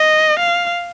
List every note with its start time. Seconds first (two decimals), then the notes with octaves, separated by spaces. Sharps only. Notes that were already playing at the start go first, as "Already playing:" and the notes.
Already playing: D#5
0.40 F5